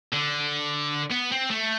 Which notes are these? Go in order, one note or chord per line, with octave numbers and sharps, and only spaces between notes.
D3
B3
C4
A3